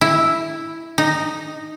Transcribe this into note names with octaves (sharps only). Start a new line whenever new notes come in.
E4
D#4